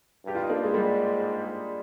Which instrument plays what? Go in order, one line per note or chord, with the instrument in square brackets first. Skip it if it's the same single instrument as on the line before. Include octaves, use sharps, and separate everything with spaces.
[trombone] G2 [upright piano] G4
[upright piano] F4
D#4
A#3 D4
G#3
[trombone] G#2 [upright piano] G3 A#3